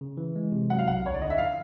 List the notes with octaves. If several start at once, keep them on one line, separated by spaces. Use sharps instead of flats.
C#3
E3
G#3
C3
F#3 F#5
F5
B1 F#5
D2 C#5
D5
D3 D#5
E5
F3 F5